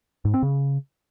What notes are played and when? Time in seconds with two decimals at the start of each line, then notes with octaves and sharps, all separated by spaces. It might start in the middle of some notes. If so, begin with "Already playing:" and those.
0.25 G#2
0.34 C4
0.43 C#3